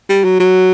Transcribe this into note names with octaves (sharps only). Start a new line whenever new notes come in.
G3
F#3
F#3